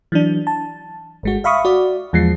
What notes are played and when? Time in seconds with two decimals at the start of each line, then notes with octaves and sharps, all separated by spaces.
0.12 E3 F#3 D4
0.47 A5
1.23 G#1 G#3 F#4
1.44 E5 F5 B5 C#6 D#6
1.65 F#4 D5
2.13 E2 F3 G#3 C7